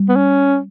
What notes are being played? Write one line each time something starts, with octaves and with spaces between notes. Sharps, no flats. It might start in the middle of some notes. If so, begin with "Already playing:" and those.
Already playing: G3
B3
C#4